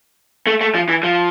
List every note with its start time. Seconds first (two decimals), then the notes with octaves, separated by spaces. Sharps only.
0.47 A3
0.61 A3
0.75 F3
0.89 E3
1.03 F3